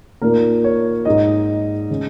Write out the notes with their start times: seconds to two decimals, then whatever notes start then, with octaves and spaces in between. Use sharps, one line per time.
0.22 A#2 A#3 D#4 A#4
0.64 C#5
1.05 G#2 G#3 D#4 D#5
1.90 C#3 G#3 C#4